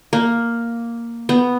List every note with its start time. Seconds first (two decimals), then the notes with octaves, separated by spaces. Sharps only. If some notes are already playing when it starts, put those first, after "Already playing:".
0.13 A#3
1.29 B3